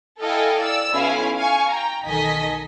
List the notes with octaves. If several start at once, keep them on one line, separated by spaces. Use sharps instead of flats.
E4 A4 D#5 F5 G5 G#5
D5 E6
B1 C#4 E4 F5 G#5
F5 G#5 C#6
G5 A#5
B1 D#3 A4 D#5 G#5 B6